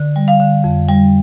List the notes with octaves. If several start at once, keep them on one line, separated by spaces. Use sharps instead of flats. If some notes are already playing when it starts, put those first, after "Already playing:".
Already playing: D3
G3
F5
D3
F2
G3